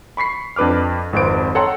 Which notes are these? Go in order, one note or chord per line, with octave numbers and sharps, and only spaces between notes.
B5 C#6 B6 C7
F2 D4 B4 D6 F6
G#1 F2 B4 C5 D7
A4 C#5 F#5 G5 A#5 C6